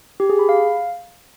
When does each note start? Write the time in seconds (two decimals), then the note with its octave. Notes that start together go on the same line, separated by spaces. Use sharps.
0.20 G4
0.30 G#4
0.39 B5
0.49 F5